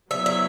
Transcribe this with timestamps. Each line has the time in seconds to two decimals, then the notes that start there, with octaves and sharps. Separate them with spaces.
0.11 F#3 B3 E4 E5
0.26 E5